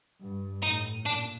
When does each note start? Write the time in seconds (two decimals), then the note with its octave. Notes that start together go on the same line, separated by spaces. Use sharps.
0.20 G2
0.63 A2 D#4
1.06 A#2 D4